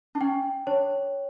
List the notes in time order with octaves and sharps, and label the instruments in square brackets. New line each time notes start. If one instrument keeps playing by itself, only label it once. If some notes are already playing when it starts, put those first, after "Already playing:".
[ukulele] D4
[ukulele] C#4 [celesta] G5
[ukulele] D4 [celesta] C#5